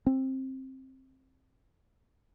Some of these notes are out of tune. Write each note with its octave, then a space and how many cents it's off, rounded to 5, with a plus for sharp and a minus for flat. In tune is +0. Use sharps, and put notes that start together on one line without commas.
C4 +15